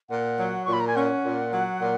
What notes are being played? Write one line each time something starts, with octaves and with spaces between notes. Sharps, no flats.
A#2 F#5
F#3
A#2 C#6
B5
A#5
G#5
C#4 F#5
A#2
F#3
A#2